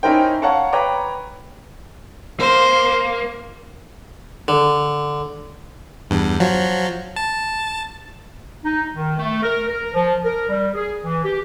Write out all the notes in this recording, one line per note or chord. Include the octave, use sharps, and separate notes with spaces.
C#4 D#4 E4 A#4 C5 G5
C#5 F5 F#5 A5 A#5 C#6
B4 C#5 G5 A#5 D6
A#3 C5
D3
E2 G2
F3 F#3
A5
D#4
D#3
A3
A#4
A#4
F3
A#4
G3
G#4
E3
G4